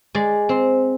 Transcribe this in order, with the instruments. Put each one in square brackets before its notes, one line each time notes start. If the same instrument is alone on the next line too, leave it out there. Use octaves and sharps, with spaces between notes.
[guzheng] G#3 D5
C4